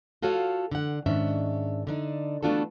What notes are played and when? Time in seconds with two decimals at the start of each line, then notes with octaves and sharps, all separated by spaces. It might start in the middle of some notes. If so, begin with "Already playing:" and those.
0.22 F4 F#4 A4 C#5 F5
0.71 D3 F#5
1.06 G#2 D#3 C#4 D4 E5
1.87 D3 D4 D#4
2.43 A3 B3 D4 F4 F#4 A4